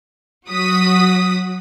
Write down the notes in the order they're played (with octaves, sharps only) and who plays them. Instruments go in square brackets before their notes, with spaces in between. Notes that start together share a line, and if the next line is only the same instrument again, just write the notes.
[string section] F#3 F#4 D#6 B6